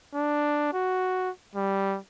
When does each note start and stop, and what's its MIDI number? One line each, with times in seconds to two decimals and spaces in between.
0.14 0.69 62
0.73 1.30 66
1.55 1.97 55